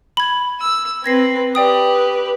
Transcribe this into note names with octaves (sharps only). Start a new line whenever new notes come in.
B5 G#6
E6
C4 B4 G#6 A#6 C7
G4 B4 D5 G5 D#6